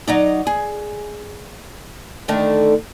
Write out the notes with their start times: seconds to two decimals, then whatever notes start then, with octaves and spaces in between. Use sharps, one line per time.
0.08 F#3 D#4 D5
0.47 G#4
2.28 D3 D#3 A3